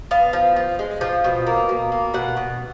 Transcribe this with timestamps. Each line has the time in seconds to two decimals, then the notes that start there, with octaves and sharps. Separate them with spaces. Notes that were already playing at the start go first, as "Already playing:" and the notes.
0.11 B3 F5
0.33 F3
0.56 F3
0.79 G#3
1.01 F3
1.24 B2
1.47 A#3
1.69 B2
1.92 A#3
2.14 B2 F#5
2.37 B2